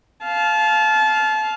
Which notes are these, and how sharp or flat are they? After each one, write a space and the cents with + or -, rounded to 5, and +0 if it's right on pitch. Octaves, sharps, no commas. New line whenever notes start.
F5 +0 A5 -30